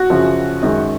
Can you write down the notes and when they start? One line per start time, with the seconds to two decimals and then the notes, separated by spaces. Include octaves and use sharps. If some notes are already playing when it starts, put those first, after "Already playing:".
Already playing: F#4
0.10 F#2 C#3 F3
0.63 F#2 D#3 G#3